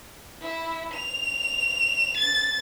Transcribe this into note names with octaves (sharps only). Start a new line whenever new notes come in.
E4
F7
A6